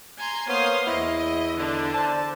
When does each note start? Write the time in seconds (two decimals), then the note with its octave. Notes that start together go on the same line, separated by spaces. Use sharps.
0.16 G#5 A#5 C6
0.48 A#3 B3 C5 C#5 F5 C6 D#6
0.87 E2 E4 D#5
1.57 D3 D4
1.94 C5 D5 A5